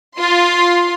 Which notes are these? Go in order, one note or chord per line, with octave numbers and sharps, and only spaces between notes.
F4 C6